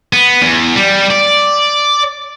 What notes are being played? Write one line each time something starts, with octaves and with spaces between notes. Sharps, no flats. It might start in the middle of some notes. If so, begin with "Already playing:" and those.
B3
E2
G3
D5